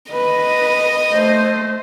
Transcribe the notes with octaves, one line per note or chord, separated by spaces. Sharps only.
B4 D#5
A3 C5